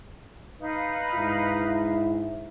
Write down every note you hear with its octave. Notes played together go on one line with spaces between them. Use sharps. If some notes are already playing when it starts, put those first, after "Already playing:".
D#4 B4 F5
G#2 E4